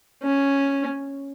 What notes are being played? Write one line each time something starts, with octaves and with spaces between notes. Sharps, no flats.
C#4